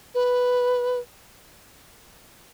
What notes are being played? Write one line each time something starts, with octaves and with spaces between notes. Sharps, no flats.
B4